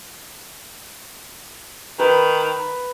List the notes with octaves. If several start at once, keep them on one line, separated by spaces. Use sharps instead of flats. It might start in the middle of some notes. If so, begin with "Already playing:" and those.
D#3 B4